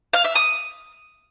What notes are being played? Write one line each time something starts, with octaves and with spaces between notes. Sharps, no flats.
F5
E5
D#6